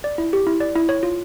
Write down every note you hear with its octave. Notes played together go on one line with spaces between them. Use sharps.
D5
E4
G4
E4
D5
E4
C#5
F4